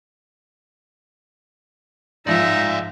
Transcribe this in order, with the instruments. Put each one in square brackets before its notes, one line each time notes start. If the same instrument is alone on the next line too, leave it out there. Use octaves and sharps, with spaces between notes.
[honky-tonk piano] G#2 F3 F4 [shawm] D#4 [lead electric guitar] D5 F5 [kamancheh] E5